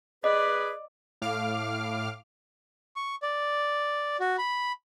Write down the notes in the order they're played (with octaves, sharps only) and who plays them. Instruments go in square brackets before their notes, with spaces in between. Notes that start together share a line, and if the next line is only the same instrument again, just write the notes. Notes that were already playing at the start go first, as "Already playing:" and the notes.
[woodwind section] G#4 B4 [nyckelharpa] D5 [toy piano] D#5
[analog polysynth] A2 F5 D6 F6
[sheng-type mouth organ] C#6
D5
F#4
B5